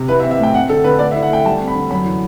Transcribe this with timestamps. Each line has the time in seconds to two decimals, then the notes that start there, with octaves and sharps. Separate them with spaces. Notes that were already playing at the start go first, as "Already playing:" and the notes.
Already playing: C3
0.08 E4 B4
0.20 E5
0.24 C4
0.31 E5
0.39 A2 G5
0.54 C4 F#5
0.69 D3 A4
0.84 D3 B4
0.99 A3 D5
1.11 E5
1.15 E4
1.22 F#5
1.30 A3 G5
1.44 G3 A5
1.60 C4
1.67 B5
1.75 D3
1.90 F#2 B5
2.05 E3